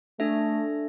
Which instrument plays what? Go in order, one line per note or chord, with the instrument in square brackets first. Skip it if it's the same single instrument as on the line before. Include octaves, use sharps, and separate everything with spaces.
[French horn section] A3 [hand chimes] D4 A4 E5